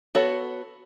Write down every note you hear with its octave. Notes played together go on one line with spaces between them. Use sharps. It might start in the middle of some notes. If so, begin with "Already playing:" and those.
B3 F#4 A4 C#5